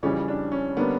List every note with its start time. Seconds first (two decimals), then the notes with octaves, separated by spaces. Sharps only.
0.03 F2 C#3 E3 G3 C#4
0.28 D4
0.52 C#4
0.77 D3 G3 A#3 B3 D4